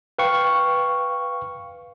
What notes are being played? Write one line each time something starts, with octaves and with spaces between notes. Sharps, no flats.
B4 F5 G5 C#6